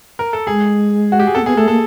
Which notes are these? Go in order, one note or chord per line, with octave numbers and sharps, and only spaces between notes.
A#4
A4
G#3 G#4
F#4
G4
G#4
C4 A4
A#3
B3 G#4
A3 A4
A#3 A4